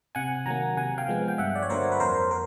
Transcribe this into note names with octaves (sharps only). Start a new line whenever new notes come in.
C3 F#5 G#5
D#3 F#3 A#3 G#5 A#5
C3 F#5 G#5
F5 G5
F3 G#3 B3
G5
G2 E5 F#5
D5
C#5
D3 F#3 A#3 A#4 C5
B4
F2 A#4 C5
A#4